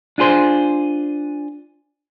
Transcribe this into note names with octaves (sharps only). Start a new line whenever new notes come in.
D4 F4 G#4 C5